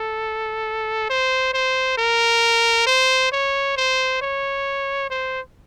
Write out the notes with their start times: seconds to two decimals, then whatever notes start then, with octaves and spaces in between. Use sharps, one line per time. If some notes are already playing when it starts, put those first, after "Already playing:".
Already playing: A4
1.10 C5
1.53 C5
1.98 A#4
2.87 C5
3.32 C#5
3.77 C5
4.22 C#5
5.10 C5